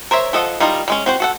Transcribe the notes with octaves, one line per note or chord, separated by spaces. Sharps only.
A#4 C5 C#5 E5
F3 A4 D#5 F#5
G3 D#4 F4 A#4 D#5
G3 G#3 C#4
C4 F#4 C5
F#4 A4 F#5